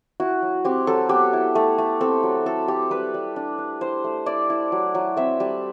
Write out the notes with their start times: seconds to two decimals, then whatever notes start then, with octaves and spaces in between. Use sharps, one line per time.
0.20 E4 F#4
0.42 F#3
0.64 C4 G4
0.87 F#3 A4
1.09 B3 G4
1.33 E4
1.55 A3
1.78 A3
2.01 C4 A4
2.23 F#3
2.45 E4 A4
2.68 A3 G4
2.90 G3 B4
3.14 G3
3.36 D4
3.58 D4
3.81 E4 C5
4.04 A3
4.26 E4 D5
4.50 E4
4.72 F#3
4.95 F#3
5.17 C4 E5
5.40 G3